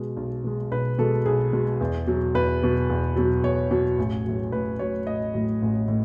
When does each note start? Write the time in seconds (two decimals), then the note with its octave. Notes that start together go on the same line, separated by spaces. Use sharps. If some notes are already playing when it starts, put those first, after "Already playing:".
Already playing: B2 G#3
0.17 B1
0.44 B2 G#3
0.71 B1 B4
0.99 B2 G#3 A4
1.26 B1 G#4
1.53 B2 G#3
1.81 E2
2.07 B2 F#3
2.34 E2 B4
2.62 B2 F#3
2.90 E2
3.16 B2 F#3
3.43 E2 C#5
3.71 B2 F#3
3.98 A1
4.25 A2 F#3
4.52 A1 B4
4.79 A2 F#3 C#5
5.07 A1 D#5
5.34 A2 F#3
5.62 A1
5.88 A2